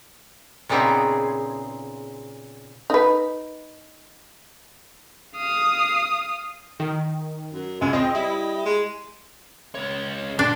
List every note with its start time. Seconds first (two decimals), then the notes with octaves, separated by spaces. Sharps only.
0.69 A#2 C#3 B3 C4 D#4 G#4
2.90 D#4 B4
5.36 F5 D#6
6.80 D#3
7.53 F#2
7.81 C#2 G#3 G#5
7.93 C4 F4 D#5
8.15 G3 E4
8.65 G#3
9.75 C#2 C#5
10.39 A#2 D4 C6